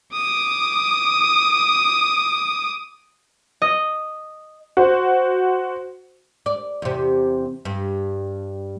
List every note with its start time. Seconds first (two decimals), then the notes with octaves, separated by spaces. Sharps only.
0.14 D6 D#6
3.62 D#5
4.77 F#4 C5
6.46 D5
6.82 E2 C3
7.65 G2